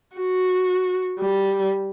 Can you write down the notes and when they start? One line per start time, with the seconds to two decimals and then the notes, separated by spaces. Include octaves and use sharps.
0.16 F#4
1.19 G3